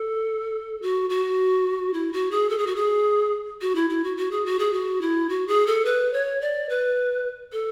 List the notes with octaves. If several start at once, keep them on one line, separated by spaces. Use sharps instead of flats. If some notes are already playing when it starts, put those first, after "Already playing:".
Already playing: A4
F#4
F#4
E4
F#4
G#4
A4
G#4
F#4
G#4
F#4
E4
E4
F#4
F#4
G#4
F#4
G#4
F#4
E4
F#4
G#4
A4
B4
C#5
D5
B4
A4